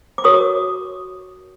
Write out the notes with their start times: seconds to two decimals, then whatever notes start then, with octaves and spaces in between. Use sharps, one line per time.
0.18 D6
0.24 F#4 A#4 C#5 C#6 D#6